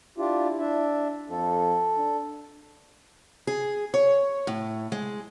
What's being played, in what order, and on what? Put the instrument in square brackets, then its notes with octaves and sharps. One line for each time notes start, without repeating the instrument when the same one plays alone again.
[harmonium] D4 F4 G4 [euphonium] E4
[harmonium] D4 E5
[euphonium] F2 [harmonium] A4
[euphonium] D4
[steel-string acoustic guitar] G#4
C#5
A2
G#3